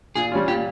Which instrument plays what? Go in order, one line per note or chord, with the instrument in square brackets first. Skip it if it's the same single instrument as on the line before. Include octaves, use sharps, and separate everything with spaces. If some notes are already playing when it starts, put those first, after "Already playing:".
[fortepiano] A#2 [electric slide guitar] G#4
[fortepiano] G3 C#4 F4
[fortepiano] A#2 [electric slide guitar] G4